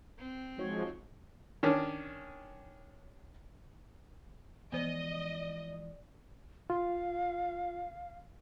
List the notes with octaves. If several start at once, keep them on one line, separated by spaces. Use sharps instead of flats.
C4
F3 G#3 D#4 F#4 C#5
D#3 C#4 D4
E3 F3 G#3 B3 C5 D5 D#5
F4 F5